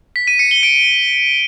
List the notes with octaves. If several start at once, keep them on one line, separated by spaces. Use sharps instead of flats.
B6
D#7
C#7
G7
D7